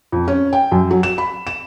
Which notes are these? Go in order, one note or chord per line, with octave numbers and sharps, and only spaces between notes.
F2
C#4
G5
F#2
F#3
E7
B5
E7